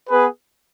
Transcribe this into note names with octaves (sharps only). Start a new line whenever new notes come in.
B3 G#4 B4